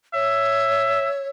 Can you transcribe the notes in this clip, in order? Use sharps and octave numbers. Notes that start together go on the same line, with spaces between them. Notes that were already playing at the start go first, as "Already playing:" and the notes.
C#5 E5